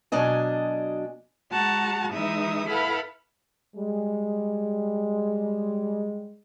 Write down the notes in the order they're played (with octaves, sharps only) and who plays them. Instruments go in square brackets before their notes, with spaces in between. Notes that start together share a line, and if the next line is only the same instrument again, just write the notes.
[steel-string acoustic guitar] B2 F#3 D4 D#5 G#5
[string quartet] G#3 F#4 F#5 A5 A#5
E3 G#3 D#4 E5 D#6
E4 A4 B4 F5 F#5 B5
[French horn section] G3 G#3